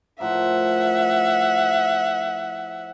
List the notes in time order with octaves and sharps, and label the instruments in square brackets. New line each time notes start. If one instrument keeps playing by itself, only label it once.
[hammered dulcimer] A2 F3 A#4 [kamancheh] E5 F#5